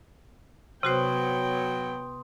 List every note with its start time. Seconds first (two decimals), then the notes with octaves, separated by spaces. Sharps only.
0.83 C3 F#3 B3 F#4 C5 G5 C6 D#6